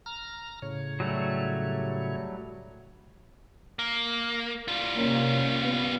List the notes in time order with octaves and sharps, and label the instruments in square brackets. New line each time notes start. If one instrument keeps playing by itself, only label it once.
[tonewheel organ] A#5 F6
A2 C#3 C#5
[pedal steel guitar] F#3 G3 A3
[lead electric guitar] A#3
G3 F4
[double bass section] C3 A#3 C#4
B3